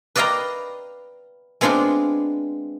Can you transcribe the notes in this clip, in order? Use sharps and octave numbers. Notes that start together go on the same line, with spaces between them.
B4 D5 D#5 F5 G5 A#5
G#3 B3 C4 D4 F4 C5